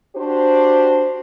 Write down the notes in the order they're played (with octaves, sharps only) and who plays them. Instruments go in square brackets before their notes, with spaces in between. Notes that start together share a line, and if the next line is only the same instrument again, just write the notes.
[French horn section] D4 F#4 G4 C5